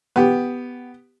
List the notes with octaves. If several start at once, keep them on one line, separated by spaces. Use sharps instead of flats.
B3 G4